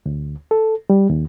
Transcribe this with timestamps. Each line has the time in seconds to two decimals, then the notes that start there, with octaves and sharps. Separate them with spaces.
0.06 D2
0.51 A4
0.90 G3
1.10 D#2